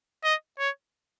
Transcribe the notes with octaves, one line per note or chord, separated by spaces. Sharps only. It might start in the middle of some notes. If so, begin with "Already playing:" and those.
D#5
C#5